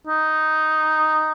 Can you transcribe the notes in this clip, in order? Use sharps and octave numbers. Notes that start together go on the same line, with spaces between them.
D#4